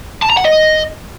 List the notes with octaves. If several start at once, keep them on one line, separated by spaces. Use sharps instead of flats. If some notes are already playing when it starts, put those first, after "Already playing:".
A5
A#5
F#5
D#5